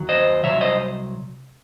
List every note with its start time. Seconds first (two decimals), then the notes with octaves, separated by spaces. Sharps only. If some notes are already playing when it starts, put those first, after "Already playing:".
Already playing: D#2 D#3 F#3
0.09 C5 D#5
0.44 C2 C3 F#3 C#5 E5
0.61 C5 D#5